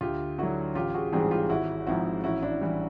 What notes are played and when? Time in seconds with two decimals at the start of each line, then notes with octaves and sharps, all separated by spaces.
0.01 D2 F4 G4
0.38 D3 F#3 E4 F#4
0.75 A1 F4 G4
0.94 F#4 G#4
1.12 G#2 E3 G3 C4 F#4 G#4
1.31 F4 G4
1.50 G#1 E4 F#4
1.87 G#2 F3 G#3 C4 E4 F#4
2.24 A1 E4 F#4
2.42 D4 E4
2.61 E3 G3